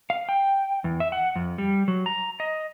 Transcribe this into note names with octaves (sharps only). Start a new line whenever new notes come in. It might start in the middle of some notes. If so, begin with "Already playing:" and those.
F5
G5
E2
E5
F#5
F2
G3
F#3
A#5
D#5